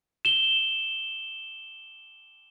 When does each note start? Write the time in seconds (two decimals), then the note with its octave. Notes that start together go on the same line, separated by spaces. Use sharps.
0.25 E7 G7